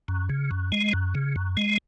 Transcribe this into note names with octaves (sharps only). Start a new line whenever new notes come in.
F#2
C#3
F#2
G#3
F#2
C#3
F#2
G#3